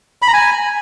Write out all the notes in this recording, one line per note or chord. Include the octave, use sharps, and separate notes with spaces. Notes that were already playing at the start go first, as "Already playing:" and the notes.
B5
A#5
G#5